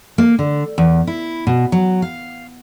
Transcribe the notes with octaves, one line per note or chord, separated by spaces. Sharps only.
A#3
D3
E2
E4
B2
F#3
F5